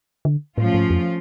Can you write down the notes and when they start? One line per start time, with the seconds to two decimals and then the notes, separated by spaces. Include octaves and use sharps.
0.25 D3
0.58 A2 F3 A3 C#4 F4
0.74 G#2
0.90 F2